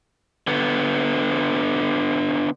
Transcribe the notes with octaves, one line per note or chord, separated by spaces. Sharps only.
D3 B3